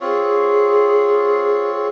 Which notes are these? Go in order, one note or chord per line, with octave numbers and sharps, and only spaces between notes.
C4 F4 G#4 C#5